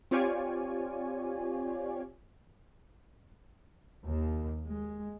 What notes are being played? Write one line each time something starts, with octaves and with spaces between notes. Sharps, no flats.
C4 F4 G4 C#5 D5 G#5
D#2
G#3